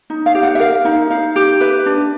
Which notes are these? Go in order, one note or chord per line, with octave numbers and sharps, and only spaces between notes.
D#4
F5
G4
F#5
E5
A#4 F5
D#4
D#4 F5
G4
B4 E5
D4